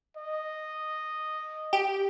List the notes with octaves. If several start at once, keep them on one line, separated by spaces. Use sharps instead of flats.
D#5
G4